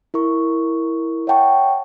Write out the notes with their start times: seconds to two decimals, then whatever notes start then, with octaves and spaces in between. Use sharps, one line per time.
0.14 E4 A#4 C#6
1.27 C#5 E5 F#5 G5 A5 C#6